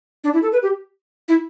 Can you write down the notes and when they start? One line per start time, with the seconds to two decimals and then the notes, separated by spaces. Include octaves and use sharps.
0.24 D4
0.34 E4
0.42 A4
0.52 B4
0.62 G4
1.28 E4